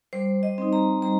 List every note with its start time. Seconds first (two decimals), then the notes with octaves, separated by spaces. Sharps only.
0.13 G3 C5
0.43 D#5
0.58 C4 D#4
0.73 A#5
1.02 G3 A#5